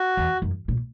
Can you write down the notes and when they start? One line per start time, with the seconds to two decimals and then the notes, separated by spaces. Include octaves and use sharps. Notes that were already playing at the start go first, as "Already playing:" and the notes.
Already playing: F#4
0.17 E2
0.42 F#2
0.68 A#2